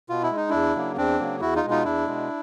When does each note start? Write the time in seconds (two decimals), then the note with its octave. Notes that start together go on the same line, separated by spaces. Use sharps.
0.09 B2 F4
0.23 E4
0.31 G#3
0.37 D#4
0.50 E2 D4 E4
0.75 C#3 F#3 A#3
0.97 E2 C4 D4
1.19 C#3 F#3 A#3
1.41 E2 E4 F#4
1.55 D#4 F4
1.63 B2 G#3
1.70 D#4 F4
1.84 E2 D4 E4
2.07 B2 G#3